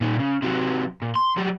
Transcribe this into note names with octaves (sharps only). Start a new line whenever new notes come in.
A#2 D#3
C#3
C3 F#3
A#2
C6
F#3 G3